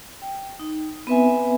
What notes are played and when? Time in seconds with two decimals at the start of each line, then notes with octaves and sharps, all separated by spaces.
0.22 G5
0.60 D#4
1.07 B3 C4 B4 E5 G#5